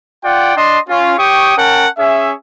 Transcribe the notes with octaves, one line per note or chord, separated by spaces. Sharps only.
F4 D5 F#5 G5
D4 D#5 A5 C6
C#4 F4
G4 C#5 G5 C#6 D#6
C#4 A#4 F#5 G5 A5
C#4 G#4 E5